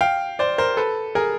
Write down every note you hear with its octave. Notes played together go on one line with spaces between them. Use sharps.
F5 G5
C5 D5
A#4 C5
A4 B4
G#4 A#4